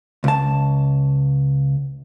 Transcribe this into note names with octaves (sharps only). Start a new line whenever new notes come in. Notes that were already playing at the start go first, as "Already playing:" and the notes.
C#2 A5